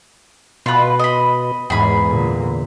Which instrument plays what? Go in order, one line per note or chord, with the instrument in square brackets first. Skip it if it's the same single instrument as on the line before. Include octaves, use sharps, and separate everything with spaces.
[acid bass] B2 [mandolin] F4 B4
[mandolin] D#5 B5
[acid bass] E2 [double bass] G#2 [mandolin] G#4 B5
[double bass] A#2 D3